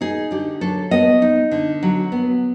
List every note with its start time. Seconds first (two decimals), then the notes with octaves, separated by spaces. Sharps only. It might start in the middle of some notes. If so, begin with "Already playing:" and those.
0.01 D#4 G#4
0.31 D3 G4
0.61 F#3 A4
0.91 B3 D#5
1.22 D#4
1.51 D3
1.83 F#3
2.12 B3